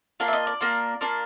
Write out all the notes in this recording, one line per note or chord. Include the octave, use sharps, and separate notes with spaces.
A#3 D4 F4 F5
E5
D#5
D5
A#3 D4 F4
A#3 D4 F4